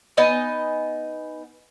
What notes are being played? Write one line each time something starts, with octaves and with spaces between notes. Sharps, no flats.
B3 D#4 D#5 G#5